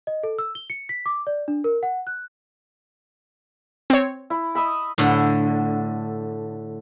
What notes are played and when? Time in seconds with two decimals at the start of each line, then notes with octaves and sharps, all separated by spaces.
0.07 D#5
0.23 A4
0.39 E6
0.55 G7
0.70 C#7
0.89 B6
1.06 D6
1.27 D5
1.48 D4
1.64 A#4
1.83 F#5
2.07 F#6
3.90 C4 C#5
4.30 E4
4.55 D#5 E5 B5
4.98 A2 D3